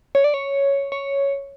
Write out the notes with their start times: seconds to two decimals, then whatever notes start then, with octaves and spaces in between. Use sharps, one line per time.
0.15 C#5
0.24 D5
0.34 C#5
0.92 C#5